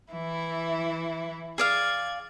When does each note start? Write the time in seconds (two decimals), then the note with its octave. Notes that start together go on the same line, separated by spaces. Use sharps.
0.13 E3 E4
1.58 G#4 D5 F5 G#6